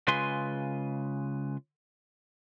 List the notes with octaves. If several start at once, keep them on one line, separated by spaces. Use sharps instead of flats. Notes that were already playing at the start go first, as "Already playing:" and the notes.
C#3 G#3 F4 B4 G#5 C6